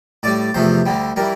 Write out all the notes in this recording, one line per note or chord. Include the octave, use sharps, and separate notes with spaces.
A2 G3 D5
E2 C3 F3 A3 C5
D2 D3 G3
E3 G3 A#4